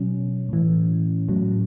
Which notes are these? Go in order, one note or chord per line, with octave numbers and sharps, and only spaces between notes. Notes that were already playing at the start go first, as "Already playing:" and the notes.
Already playing: B2 F#3 C#4
A2 E3
A2 F#3